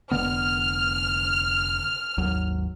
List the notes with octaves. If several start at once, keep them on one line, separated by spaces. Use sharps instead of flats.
F1 D3 B3 F6
G#1 D#2 F#3